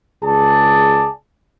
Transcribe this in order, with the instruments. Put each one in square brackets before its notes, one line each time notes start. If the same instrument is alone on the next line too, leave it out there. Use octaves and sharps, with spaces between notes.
[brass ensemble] C#2 G#4 D5 A5